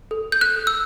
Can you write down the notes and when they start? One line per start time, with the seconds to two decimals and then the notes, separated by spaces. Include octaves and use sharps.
0.11 A4
0.32 G6
0.41 F#6
0.56 A4
0.67 E6